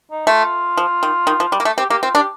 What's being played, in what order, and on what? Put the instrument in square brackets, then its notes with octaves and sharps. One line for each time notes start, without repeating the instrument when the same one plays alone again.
[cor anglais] D#4
[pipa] A3 [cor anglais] F4
[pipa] F3
D#3
D#3
F3
G3
A#3
A3
[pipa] C4 [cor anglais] G4
[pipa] A#3 [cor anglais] G4
[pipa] C4 [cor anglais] F4
[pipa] D4 [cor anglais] G4